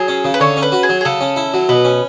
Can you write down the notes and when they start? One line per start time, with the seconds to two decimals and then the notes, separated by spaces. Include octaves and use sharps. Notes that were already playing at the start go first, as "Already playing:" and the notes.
Already playing: F#3 G#4
0.08 C#4
0.24 C#3
0.34 B4
0.40 D3 C#5
0.57 C#4
0.62 B4
0.72 F#4
0.83 G#4
0.89 F#3
1.01 G#4
1.05 C#3 A4
1.21 C#4
1.36 E4
1.54 F#3
1.69 B2 B4
1.85 C#4